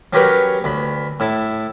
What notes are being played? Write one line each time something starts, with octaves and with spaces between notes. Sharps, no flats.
F#3 C#4 G4 A#4 B4 C#5
D2 B5
A2 E4 A5